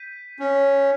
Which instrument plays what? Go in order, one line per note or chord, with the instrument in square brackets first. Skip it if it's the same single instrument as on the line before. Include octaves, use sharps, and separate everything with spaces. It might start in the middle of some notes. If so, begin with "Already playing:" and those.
Already playing: [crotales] G6 B6 D#7
[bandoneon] C#4